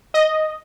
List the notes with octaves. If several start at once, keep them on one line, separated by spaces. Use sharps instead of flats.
D#5